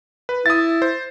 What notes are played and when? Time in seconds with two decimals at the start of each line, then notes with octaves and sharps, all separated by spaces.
0.29 B4
0.46 E4 D#6 A6
0.82 C5